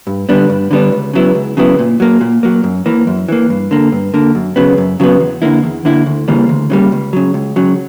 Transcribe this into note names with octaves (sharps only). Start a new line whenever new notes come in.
G2
D3 G3 B3 D4
G2
D3 G3 B3 D4
C#2
C#3 F#3 B3 E4
C#2
C#3 F#3 B3 E4
A#2
F#3 A#3
A#2
F#3 A#3
F#2
E3 A#3
F#2
E3 A#3
G2
D3 A#3
G2
D3 A#3
F#2
C#3 F#3 B3
F#2
C#3 F#3 B3
E2
D3 A#3 E4
E2
D3 A#3 E4
D2
C#3 E3 G3 A#3
D2
C#3 E3 G3 A#3
C#2
C#3 F#3
C#2
C#3 F#3